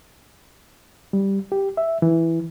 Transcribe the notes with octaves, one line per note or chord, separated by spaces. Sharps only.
G3
G4
E5
E3